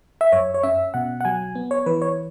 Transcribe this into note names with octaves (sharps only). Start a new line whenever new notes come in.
E5
F#2 C#5
C#5
C#4 E5
B2 F#5
F#5
F#3 G#5
B3
C#5
E3 B4
C#5